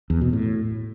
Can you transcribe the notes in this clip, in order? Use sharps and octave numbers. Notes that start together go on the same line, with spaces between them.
E2
B2
A2